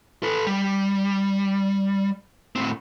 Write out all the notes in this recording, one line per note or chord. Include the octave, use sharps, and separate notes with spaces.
A4 B4
G3
A2 C4